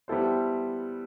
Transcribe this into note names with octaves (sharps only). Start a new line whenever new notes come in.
G3 B3 E4 A4 C5